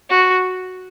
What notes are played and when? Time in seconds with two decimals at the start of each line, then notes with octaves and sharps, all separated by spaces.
0.10 F#4